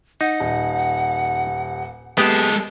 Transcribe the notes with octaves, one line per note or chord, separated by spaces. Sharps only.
D#4 F#5
D#1
G#3 B3 G4 A4 D#6